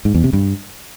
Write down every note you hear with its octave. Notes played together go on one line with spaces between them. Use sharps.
G#2
E2
C3
G2